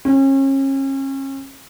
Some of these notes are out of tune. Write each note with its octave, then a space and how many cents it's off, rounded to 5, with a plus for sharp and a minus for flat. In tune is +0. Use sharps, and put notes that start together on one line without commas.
C#4 -35